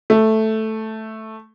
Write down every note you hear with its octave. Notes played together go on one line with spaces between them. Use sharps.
A3